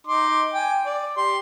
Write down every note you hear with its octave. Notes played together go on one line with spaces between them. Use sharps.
D#4 C6 D6
G5 G#5
D5
G4 C6